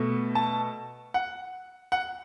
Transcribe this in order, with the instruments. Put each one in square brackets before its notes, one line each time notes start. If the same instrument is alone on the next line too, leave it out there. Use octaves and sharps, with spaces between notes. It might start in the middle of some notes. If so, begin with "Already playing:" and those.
Already playing: [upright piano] B2 A3
A5
F#5
F#5